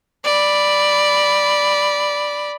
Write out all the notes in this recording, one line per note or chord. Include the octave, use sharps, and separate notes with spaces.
D5 B5